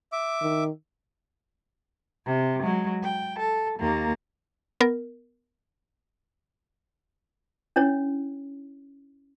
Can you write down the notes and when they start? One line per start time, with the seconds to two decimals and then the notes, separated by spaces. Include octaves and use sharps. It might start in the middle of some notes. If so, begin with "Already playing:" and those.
0.12 E5 D6
0.42 D#3
2.26 C3
2.61 F#3 G#3
3.04 G5
3.39 A4
3.80 D#2 A#3
4.81 B3 A#4
7.76 C#4 D4 E4 C#5